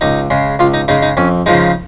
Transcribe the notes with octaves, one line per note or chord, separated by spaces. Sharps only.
C#2 D#4
C#3 G#3
C#2 F4
D#4
C#3 G#3 D#4
D#4
F2 C#4
C#3 F3 G#3 D#4